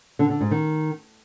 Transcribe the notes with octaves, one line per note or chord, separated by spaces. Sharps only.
D3
D3
G#2
D#3